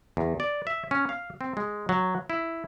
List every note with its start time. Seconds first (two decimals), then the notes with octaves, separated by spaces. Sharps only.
0.17 E2
0.40 D5
0.67 E5
0.91 C#4
1.09 F5
1.41 C4
1.57 G#3
1.89 F#3
2.30 E4